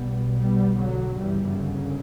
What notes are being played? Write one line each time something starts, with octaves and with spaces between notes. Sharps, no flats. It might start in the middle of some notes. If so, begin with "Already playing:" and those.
Already playing: B1 B2 G3 B3
G3 B3
D3 F#3
G1 F#2 C#3 E3 G3
D3